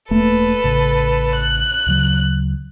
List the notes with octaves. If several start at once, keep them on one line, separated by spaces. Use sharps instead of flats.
E1 A3 A#3 A4 B4
A1 C#3
F#6
D2 C#3 F#3